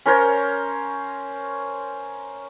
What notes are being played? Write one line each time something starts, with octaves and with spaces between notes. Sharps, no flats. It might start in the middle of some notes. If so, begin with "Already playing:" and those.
C#4 A#4 C5 C#5